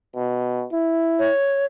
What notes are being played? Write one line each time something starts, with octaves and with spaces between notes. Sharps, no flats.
B2
E4
C#5